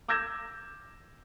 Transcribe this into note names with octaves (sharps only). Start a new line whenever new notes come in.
D6 E6 G6 G#6 A#6 E7